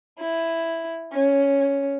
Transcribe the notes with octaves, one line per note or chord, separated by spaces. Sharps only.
E4
C#4